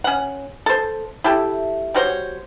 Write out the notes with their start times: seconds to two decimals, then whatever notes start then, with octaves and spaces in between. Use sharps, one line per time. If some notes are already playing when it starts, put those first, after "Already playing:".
0.04 C#4 F#5
0.66 A4 C5
1.24 E4 G4 A4
1.94 G3 F#4 C5 C#5